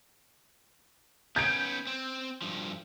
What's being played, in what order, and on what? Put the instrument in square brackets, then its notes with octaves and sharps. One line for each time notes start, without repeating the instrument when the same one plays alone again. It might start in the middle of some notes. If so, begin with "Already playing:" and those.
[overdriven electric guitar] B3 C#4 [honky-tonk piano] G6 G#6 D7
[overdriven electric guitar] C4
G2 F3